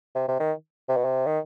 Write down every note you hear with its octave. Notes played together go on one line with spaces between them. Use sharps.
C3
C3
D#3
C3
B2
C3
D#3